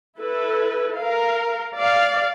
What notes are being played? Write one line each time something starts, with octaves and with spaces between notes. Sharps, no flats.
E4 A4 B4
A#4 F5
D5 F5